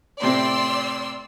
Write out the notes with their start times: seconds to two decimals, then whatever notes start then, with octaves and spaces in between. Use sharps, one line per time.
0.22 A2 C3 C4 D5 C6 E6